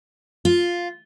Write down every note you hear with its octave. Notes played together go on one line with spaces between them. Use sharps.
F4